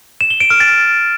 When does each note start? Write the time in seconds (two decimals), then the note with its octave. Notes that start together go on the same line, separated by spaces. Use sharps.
0.21 E7
0.31 G7
0.40 D7
0.50 F6
0.60 A6